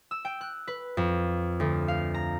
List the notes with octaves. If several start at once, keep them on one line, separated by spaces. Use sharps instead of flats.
E6
G5
F#6
B4
F2
D2
F5
A#5